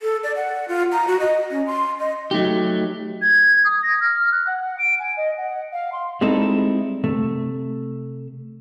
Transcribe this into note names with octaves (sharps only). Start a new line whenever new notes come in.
A4
D5
F#5
F4
A#5
F#4
D#5
C#4
C6
D#5
F#3 A3 D#4 G4
G#6
D#6
A#6
F6
F#6
F#5
D7
G#5
D#5
F#5
F5
C6
G3 G#3 C4 D#4 E4 A4
C3 A3